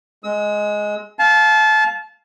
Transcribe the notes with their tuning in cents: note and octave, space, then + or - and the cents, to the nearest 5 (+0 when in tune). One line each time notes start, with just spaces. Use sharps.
G#3 +5 E6 -45
F5 +0 A5 -25